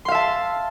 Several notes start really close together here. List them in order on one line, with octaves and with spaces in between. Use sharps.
C6 F5 E5 A5